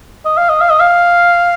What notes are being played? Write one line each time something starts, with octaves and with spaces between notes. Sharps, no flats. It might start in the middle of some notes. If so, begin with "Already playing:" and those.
D#5
F5
D#5
F5
D#5
F5